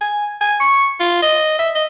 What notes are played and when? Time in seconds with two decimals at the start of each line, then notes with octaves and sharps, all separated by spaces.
0.01 G#5
0.41 G#5
0.60 C#6
1.00 F4
1.22 D#5
1.59 E5
1.75 D#5